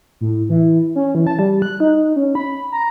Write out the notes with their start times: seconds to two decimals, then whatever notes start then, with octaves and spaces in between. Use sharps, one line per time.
0.21 A2
0.49 E3
0.95 C#4
1.15 E3
1.27 A5
1.39 G3
1.62 F#6
1.80 D#4
2.16 C#4
2.35 B5
2.72 A#5